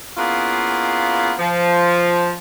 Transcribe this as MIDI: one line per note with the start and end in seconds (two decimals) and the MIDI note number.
0.17 1.33 58
0.17 1.33 59
0.17 1.33 61
0.17 1.33 64
0.17 1.33 65
0.17 1.33 68
1.39 2.32 53